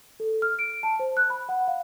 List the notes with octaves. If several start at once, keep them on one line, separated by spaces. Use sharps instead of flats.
A4
F6
D7
A5
C5
F#6
B5
F#5
F5